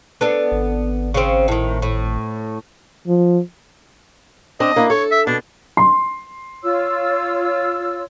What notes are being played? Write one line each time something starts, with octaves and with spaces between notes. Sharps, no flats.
B3 D4 A4
G#1
C#3 C4
A2 D#3
A2
F3
C4 D4 D#5
A#3 D4 E4
A4 C#5
E5
B2 D4
C6
F4 C#5 E6